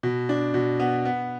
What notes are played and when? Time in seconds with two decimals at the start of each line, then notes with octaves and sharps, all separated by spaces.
0.03 B2
0.29 D4
0.54 B2
0.80 B3
1.05 B3